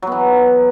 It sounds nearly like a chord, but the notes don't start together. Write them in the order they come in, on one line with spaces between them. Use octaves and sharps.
F#3 B3 E3